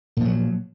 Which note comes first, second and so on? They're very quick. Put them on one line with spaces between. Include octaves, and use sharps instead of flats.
A#2 F3 F#3